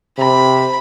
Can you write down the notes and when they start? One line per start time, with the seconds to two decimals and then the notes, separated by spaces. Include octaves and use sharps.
0.18 C3 B5